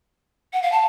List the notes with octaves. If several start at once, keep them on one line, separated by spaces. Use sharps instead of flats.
F#5
F5
A5